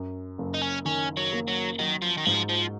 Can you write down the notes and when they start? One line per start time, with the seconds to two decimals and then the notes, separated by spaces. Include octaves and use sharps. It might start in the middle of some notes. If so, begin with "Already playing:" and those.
Already playing: F#2
0.38 F#1
0.54 D#4
0.62 C#4
0.85 D#3 C#4
1.17 F#3
1.32 A#3
1.48 F#3
1.79 D#3 F#3
2.02 F3
2.17 D#3
2.25 G#2 F3
2.49 F3